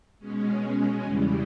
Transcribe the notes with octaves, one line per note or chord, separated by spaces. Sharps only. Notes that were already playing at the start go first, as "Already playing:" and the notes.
B2 G#3 C#4
E2 C#3 E3 G3